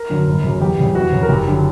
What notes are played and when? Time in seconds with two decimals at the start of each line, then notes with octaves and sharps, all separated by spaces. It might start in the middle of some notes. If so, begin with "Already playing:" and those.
Already playing: A#4
0.10 F#2 D3 F#3
0.27 G1
0.43 F#2 C#3 F#3
0.61 E2 G4
0.78 C#3 G3
0.95 E2 F#4
1.12 C#3 F#3
1.23 A#4
1.29 F#1 G4
1.48 D3 F#3